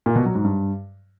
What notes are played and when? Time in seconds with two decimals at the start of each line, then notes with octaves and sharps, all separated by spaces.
0.06 A#2
0.16 B2
0.25 F#3
0.35 G#2
0.45 G2